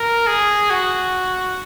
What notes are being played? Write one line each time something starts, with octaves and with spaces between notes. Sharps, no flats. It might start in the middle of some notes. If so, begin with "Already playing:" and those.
Already playing: A#4
G#4
F#4